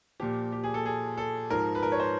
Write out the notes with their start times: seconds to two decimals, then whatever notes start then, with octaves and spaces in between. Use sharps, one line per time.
0.20 A#2 F3 G4
0.52 G4
0.64 G#4
0.74 A4
0.86 G#4
1.18 A4
1.50 G#2 F3 A#4
1.75 B4
1.83 A#4
1.92 C#5
2.00 C5